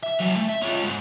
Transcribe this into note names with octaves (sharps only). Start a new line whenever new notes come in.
E5
F#3 A4
A3
E5
C#4 F4
G#2